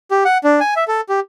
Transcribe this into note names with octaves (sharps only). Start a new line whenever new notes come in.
G4
F#5
D4
G#5
E5
A4
G4